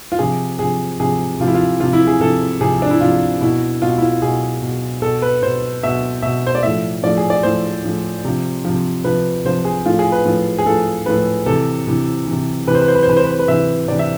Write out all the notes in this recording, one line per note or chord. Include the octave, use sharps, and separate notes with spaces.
F4
C3 F3 G#4
C3 F3 G#4
C3 F3 G#4
C3 F3 E4 F4
F4
C3 F3 F4
E4
G#4
C3 F3 A4
C3 F3 G#4
D4
E4
C3 F3 F4
B2 E4
B2 F4
E4
F4
B2 G#4
B2
B2 A4
B4
B2 C5
B2 E5
B2 E5
C5
D5
A2 F3 E5
A2 F3 D5
G#4
D5
A2 F3 C5
A2 F3
C3 F3
C3 F3
C3 F3 B4
C3 F3 C5
G#4
A2 F3 F4
G#4
B4
A2 F3
G#4
A2 F3 A4
A2 F3 B4
C3 E3 A4
C3 E3
C3 E3
C3 E3 B4
C5
B4
C5
B4
C5
C3 E3 B4
C5
B4
C5
B4
C3 E3 E5
C3 E3 D5
E5